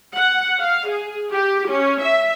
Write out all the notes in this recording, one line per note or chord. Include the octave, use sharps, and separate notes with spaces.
F#5
F5
G#4
G4
C#4
E5